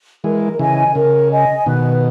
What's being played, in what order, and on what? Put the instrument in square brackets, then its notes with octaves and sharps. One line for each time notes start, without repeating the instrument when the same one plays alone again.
[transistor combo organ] E3 G#3 [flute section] A#4
[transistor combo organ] C#3 E3 [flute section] D#5 G#5
[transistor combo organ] C#3 [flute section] A#4
[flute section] D#5 G#5
[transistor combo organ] B2 D#3 [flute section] B4